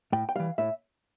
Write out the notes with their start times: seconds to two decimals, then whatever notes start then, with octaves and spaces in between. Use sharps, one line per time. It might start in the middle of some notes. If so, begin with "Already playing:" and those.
0.13 A2 G5
0.29 G5
0.36 E3 G3 F5
0.58 A2 E5